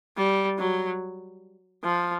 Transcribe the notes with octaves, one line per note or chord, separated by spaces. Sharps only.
G3
F#3
F3